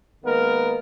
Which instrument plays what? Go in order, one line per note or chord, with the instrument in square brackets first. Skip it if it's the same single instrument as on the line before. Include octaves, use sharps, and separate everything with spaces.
[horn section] D#3 G#3 A#3 B3 A#4